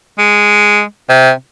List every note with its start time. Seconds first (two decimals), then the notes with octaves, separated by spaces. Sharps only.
0.18 G#3
1.10 C3